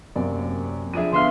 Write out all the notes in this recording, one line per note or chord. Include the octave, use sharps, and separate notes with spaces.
F#2 C3 A#3 D5
F2 D4 G#4 E5 D#7
D3 B3 E5 F5 C6 F6